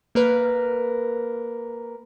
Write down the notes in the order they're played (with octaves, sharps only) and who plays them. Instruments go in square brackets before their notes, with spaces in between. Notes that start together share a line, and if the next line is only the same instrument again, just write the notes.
[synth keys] A#3 A#4 B4